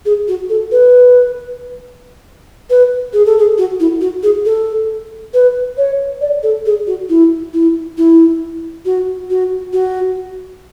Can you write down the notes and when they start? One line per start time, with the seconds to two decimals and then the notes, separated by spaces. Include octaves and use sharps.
0.05 G#4
0.28 F#4
0.49 A4
0.72 B4
2.70 B4
3.13 G#4
3.26 A4
3.39 G#4
3.58 F#4
3.80 E4
4.01 F#4
4.23 G#4
4.45 A4
5.34 B4
5.77 C#5
6.21 D5
6.43 A4
6.66 G#4
6.87 F#4
7.09 E4
7.54 E4
7.98 E4
8.85 F#4
9.30 F#4
9.73 F#4